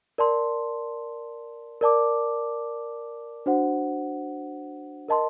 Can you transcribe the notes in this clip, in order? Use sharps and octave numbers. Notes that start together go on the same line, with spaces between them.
A#4 D5 A5 C6
A#4 D5 A5 D6
D4 F#4 C5 F#5
A#4 D#5 A5 C6